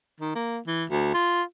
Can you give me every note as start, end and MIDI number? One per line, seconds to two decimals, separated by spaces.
0.20 0.33 51
0.35 0.59 58
0.67 0.84 52
0.90 1.11 38
1.14 1.42 65